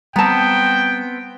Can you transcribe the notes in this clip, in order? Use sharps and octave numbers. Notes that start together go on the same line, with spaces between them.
G3 B3 C4 G5 A5 A#5